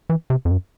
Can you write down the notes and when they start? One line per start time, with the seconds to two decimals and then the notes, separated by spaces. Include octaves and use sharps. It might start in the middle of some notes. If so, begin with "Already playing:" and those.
0.09 E3
0.30 C3
0.45 F2
0.51 F#2